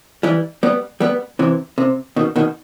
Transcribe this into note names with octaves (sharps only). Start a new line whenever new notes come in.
E3 G3
G3 B3
G3 B3
C3 E3
C3
B2 D#3
B2 D#3